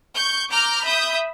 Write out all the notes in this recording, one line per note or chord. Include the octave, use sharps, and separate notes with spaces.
C#6 G6
A#5 D6 F6 G6
E5 B5 D#6 G6